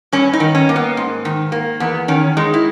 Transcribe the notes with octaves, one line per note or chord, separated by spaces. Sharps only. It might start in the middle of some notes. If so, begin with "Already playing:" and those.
G2 C#4
D#4
D#3
C#4
A#3
B3
G#2
D#3
A#3
E2 B3
D#3 C#4
G#3 D#4
E4